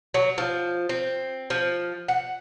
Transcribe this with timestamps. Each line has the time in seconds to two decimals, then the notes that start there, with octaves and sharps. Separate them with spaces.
0.14 F#3
0.38 F3
0.89 C4
1.50 F3
2.08 F#5